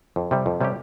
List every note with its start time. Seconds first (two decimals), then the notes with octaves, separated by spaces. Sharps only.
0.16 F2
0.31 C3 G3
0.46 F2
0.61 C3 G3 C#4 G4